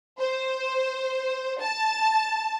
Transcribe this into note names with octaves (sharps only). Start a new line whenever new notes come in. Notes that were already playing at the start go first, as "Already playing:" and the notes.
C5
A5